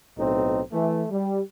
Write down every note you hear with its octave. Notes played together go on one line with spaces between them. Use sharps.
B1 A2 C4 D#4
E3 A3
G3